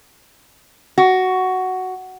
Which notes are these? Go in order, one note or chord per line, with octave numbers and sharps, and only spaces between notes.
F#4